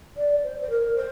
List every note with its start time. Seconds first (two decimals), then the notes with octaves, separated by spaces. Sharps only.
0.17 D5
0.43 C5
0.61 C5
0.70 A#4
0.96 C5